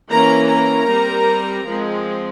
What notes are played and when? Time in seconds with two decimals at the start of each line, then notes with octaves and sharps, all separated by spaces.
0.10 E3 A#3 C#4 A#4 A#5
0.50 A#4 A#5
0.88 G3 C4
1.68 F3 G#3 C4